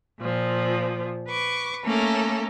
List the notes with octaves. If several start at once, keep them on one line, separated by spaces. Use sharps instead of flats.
A#2 F3
B4 C#6 D6
A3 A#3 C#4 A4 A#4